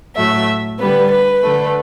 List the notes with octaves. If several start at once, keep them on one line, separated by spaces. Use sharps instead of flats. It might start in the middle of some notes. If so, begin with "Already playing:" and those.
A2 F#3 A3 E5
D3 G3 B3 B4
B4
D3 A3